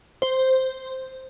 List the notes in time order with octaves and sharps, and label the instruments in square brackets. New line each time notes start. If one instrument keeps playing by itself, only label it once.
[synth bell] C5